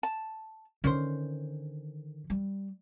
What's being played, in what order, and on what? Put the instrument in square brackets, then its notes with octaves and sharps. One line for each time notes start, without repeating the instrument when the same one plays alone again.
[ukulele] A5
[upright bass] D3 D#3 [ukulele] C#4 C5
[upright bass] G3